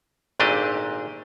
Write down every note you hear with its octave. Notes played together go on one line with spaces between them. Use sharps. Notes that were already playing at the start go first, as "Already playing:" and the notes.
G#1 A#2 A3 D4 G4 D#5